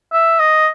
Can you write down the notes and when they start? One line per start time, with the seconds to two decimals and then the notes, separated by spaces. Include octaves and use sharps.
0.13 E5
0.40 D#5